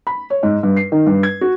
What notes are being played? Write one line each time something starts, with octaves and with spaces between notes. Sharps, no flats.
B5
C#5
G#2
G2
C7
D#3
G2
G#6
F#4